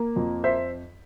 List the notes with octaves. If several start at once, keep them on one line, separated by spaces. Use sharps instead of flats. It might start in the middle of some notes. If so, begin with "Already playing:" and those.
Already playing: A#3
F2
C5 E5